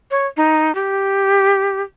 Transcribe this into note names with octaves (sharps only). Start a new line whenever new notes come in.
C#5
D#4
G4